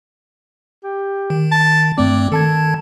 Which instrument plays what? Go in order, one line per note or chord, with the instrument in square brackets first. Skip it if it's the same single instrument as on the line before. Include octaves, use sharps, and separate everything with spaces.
[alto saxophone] G4
[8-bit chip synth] D#3
[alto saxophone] A5
[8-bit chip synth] G2 A3 C4 [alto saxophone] D5
[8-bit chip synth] D#3 A5 G#6 [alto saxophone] A4